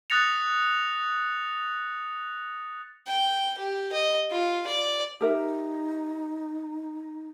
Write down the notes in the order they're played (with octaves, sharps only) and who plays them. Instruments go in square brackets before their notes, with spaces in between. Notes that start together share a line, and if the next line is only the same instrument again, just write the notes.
[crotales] D#6 F#6 A6 A#6 C#7 F7
[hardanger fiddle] G5
G4
D#5
F4
D5
[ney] D#4 [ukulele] G4 A#4 E5